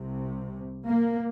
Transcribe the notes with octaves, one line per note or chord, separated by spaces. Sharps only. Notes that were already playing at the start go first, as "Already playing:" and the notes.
Already playing: C2 C3
A#3